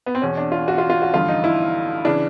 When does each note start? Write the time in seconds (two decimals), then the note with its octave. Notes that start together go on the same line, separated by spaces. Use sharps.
0.06 B3
0.15 C4
0.22 E2 B2 C#4
0.37 D4
0.52 F4
0.68 F#4
0.78 F4
0.90 F4
1.02 F#4
1.14 A1 G2 D3 F3 F4
1.28 D#4
1.44 E4
2.05 C#3 E3 D4